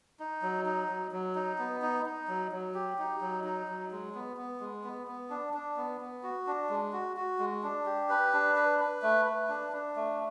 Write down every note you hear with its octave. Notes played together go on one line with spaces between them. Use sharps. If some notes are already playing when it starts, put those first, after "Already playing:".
D#4
F#3
D#4
F#3
F#3
D#4
B3
D#4
D#4
F#3
F#3
G4
D#4
F#3
D#4
F#3
G#3
B3
B3
G#3
B3
B3
D4
D4
B3
B3
F#4
D4
G#3
F#4
F#4
G#3
D4
G4
B4
D4
B4
B4
A3
B4
D4
D4
A3